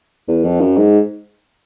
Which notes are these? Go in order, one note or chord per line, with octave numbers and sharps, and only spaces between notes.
E2
F2
F#2
G#2